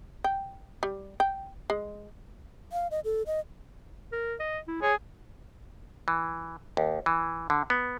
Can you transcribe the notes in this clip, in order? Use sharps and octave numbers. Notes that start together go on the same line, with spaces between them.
G5
G3
G5
G#3
F5
D#5
A4
D#5
A#4
D#5
E4
G#4 C#5
E3
D#2
E3
D3
B3